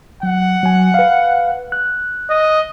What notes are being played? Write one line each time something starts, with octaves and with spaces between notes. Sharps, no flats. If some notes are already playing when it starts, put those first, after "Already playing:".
F#3 F#5
F#3 G#5
B4 F5
F#6
D#5